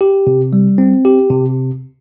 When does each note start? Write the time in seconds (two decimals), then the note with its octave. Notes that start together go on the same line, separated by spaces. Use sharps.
0.01 G4
0.27 C3
0.53 G3
0.78 C4
1.05 G4
1.30 C3